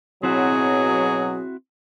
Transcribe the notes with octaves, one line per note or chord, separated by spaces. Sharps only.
B2 F#3 C4 E4 F#4 G#4